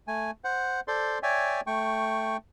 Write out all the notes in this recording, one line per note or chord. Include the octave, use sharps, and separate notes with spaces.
A3 G#5
C5 F#5
A4 C5 D5 C6
C#5 D5 E5 G5 G#5
A3 G5 C#6